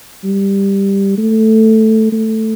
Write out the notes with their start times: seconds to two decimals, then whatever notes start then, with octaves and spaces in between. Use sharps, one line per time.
0.24 G3
1.18 A3
2.12 A3